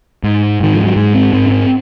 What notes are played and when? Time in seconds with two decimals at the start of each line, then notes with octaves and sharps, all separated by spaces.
0.24 G#2
0.60 G#2 D#3
0.75 F3
0.85 F#3
0.96 G#2 G#3
1.15 C4
1.33 G#2 C4
1.46 C#4
1.50 C4